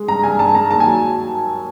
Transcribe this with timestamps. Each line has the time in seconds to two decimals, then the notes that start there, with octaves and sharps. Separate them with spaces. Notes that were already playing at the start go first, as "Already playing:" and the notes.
Already playing: G#3
0.08 G2 A#5
0.23 G2 G#5
0.39 G2 A5
0.54 G#3 A#5
0.71 D#2 A5
0.80 G#5
0.86 F#3